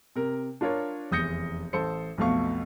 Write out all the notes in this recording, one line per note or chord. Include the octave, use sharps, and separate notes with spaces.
C3 A#4
D4 F4 A#4 C#5
F1 E2 D#6 G6 A#6 C#7
A1 A4 C5 C#7
B1 F2 B2 A3 F5 C#6